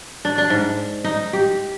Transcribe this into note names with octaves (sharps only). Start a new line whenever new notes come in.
D4
D4
G#2
D#4
G4